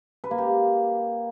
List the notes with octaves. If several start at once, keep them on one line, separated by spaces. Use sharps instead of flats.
B4
A#3
G4